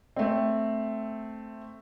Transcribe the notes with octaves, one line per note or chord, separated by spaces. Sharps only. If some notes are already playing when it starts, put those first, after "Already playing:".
A3 C4